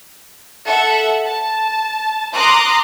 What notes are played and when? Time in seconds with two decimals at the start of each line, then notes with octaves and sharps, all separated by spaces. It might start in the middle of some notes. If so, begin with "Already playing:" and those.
0.66 A4 E5 F#5
1.26 A5
2.34 A#5 C6 D6 D#6 F6 F#6